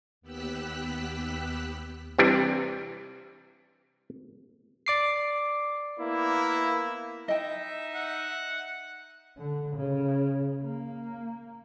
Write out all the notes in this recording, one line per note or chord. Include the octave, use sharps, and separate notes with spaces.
D#2 B3 G4 E6 F#6 B6
C3 E3 G3 D4
D5 D6 C7
A#3 B3 E4
D#4 D#5 E5 G5
F#5
D3
C#3
A#3